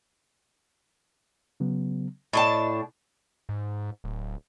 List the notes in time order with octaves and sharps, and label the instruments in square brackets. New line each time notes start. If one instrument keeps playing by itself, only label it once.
[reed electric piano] C#3 F#3 B3
[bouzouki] A2 D4 A5 [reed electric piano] D#5
[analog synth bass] G#2
D1